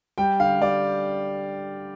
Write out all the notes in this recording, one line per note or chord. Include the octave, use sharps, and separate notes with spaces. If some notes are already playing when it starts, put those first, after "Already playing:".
G3 G5
D3 F5
G3 D5